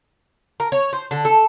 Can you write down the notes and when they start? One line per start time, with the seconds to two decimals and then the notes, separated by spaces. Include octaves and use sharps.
0.60 A#4
0.72 C#5
0.93 C5
1.11 D3
1.25 A4